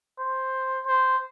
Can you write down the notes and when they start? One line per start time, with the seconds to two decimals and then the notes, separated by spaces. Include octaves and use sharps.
0.19 C5
0.86 C5